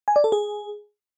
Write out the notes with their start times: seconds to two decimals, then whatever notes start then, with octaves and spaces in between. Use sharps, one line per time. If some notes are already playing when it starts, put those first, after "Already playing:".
0.08 G#5
0.16 D5
0.24 A4
0.32 G#4